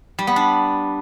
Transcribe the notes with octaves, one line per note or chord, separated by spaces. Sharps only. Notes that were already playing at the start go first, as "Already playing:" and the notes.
G3
B3
D4